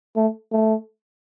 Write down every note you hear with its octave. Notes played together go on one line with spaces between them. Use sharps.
A3
A3